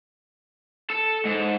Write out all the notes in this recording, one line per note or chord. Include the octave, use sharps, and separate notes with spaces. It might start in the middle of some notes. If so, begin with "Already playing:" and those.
A4
G#2